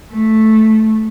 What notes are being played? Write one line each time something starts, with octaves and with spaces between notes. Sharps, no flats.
A3